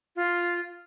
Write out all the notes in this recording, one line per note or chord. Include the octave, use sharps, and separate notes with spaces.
F4